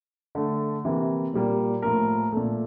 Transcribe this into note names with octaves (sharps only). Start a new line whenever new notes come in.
D3 A3
C3 E3 A#3
A#2 G3 A#3
A2 F3 A#3 A#4
A#2 A3